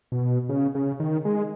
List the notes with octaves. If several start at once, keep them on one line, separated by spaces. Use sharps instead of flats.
B2
C#3
C#3
D#3
G#3